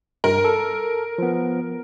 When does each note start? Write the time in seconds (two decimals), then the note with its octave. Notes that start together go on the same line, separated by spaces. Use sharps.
0.24 G2 A#4
0.45 A4
1.18 F3 B3